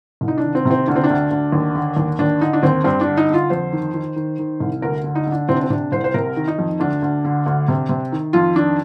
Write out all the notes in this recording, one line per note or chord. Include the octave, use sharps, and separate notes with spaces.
C2
D#4
D4
D#3
C4
C3
C4
D2 D4
C4
D4
D2
D2
D#2
D3
D#2
D#2 D4
D3 D#4
D4
D#2 C4
G2 C4
D4
D3
D#4
D3 F4
F2 C5
D#3
D#3
D#3
D#3
C2
D2 A#4
D3
D#4
D3
D4
C3 C4
D4
C4
C3 D4
C2 C5
C5
C3 A#4
D#3
D#4
F2
D2 D4
D2
D3
D2
C3
C3
D#3
F2 F4
D#3 D4